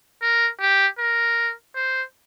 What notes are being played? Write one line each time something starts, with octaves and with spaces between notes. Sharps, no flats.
A#4
G4
A#4
C5